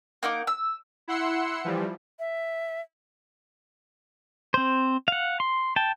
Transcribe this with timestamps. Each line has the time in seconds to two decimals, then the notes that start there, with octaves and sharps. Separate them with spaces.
0.23 A#3 D#4 F#5 D6
0.47 E6
1.08 E4 F#5 C6 E6 C#7
1.65 E3 F3 G3
2.19 E5
4.54 C4 C5
5.08 F5 F#5
5.40 C6
5.76 G5 A5